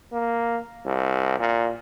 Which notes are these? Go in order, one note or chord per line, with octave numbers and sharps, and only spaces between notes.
A#3
C2
A#2